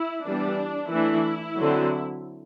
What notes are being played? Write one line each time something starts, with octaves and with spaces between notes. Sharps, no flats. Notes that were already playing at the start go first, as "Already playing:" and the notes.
Already playing: E4
E3 G3 B3 D4
E3 A3 D4 E4
D3 F#3 C4